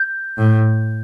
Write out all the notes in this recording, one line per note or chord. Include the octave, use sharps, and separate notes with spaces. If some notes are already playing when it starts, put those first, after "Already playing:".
Already playing: G6
A2